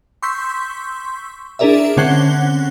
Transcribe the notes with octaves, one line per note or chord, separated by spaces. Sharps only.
C6 C#6 E6 G6 B6
D4 E4 G#4 A#4 D5 E5
D3 C4 C#4 F#5 F#6 G7